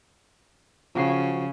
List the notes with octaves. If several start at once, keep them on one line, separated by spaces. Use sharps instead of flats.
C#3 F3 F#4 C7